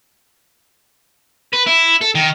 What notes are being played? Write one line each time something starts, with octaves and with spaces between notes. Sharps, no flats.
B4
E4
A4
D#3